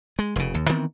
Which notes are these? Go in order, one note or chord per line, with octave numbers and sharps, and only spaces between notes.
G#3
F1 C#3
D#2
D#3 E3 B3 C4